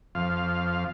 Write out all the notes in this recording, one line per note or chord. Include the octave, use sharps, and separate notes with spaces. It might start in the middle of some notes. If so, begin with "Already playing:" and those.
F2 F5